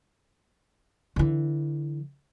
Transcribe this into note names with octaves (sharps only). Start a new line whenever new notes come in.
D3 E3